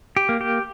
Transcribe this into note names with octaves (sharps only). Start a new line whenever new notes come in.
G4
A#3
G4